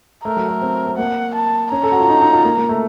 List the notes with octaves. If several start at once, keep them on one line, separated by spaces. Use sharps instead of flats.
A3 A#4
F#3
A3
C4
C4
A#3 F#5
A5
C#4 A#5
A4
F#4
F4
D#4
D#4
F4
A#3
A#3
A3